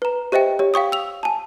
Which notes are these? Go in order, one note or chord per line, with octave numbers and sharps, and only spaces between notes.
B4 A#5
G4 C5 D#5 E5 G5
G4 C#5
F5 G5 C#6 D#6
E6 F7
G#5 A5